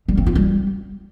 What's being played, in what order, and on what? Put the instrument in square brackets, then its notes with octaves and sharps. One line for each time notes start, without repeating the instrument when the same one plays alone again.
[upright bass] G3
C4
F4
G3